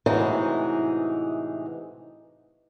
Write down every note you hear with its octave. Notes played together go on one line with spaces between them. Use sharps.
A2 C3 E3 G#3 D#4 F#4